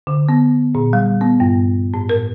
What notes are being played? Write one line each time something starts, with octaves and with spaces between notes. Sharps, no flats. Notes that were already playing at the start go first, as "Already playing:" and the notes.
D3
B3
A#2
G3
B3
G2
A2
A#4